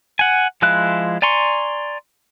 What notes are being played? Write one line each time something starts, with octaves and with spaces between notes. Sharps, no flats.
F#5 G#5
F3 G#3 E4 F5 F#6
D5 G#5 A#5 C6 C#6